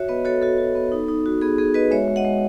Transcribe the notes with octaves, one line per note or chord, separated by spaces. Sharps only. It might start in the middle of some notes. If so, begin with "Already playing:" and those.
Already playing: F#4 C#5 E5
B3 B4 D#5
F#4 A4 C#5
F#4 A4
F#4
B3
D#4
D#4
F#4
B3 G#4
B3 G#4
F#4 B4 D#5
G#3 C#5 E5
G#3
D#5 F#5
G#3